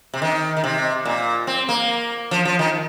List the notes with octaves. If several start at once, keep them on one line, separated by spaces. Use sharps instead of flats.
C3
D#3
D#3
C3
A#2
C4
A#3
F3
F3
D#3